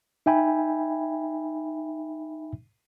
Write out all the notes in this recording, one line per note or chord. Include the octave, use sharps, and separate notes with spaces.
D#4 E5 G5 G#5 B5